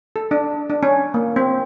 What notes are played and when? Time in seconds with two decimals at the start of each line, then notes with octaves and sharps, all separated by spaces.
0.16 A4
0.31 D4
0.70 D4
0.83 C#4
1.14 A#3
1.36 C4